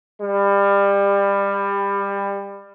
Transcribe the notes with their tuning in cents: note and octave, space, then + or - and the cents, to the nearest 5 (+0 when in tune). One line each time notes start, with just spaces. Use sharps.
G3 +25